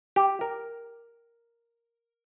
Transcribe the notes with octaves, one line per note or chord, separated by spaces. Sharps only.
G4
A#4